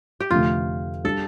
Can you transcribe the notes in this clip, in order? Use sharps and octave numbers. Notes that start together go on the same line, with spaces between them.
G4
F1 F2 D3 A3 F4
G3 D4 A4